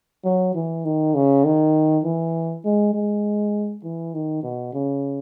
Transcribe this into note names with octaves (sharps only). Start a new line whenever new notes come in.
F#3
E3
D#3
C#3
D#3
E3
G#3
G#3
E3
D#3
B2
C#3